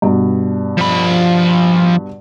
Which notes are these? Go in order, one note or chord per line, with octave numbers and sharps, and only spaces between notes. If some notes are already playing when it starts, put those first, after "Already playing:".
G2 B2
F3 B5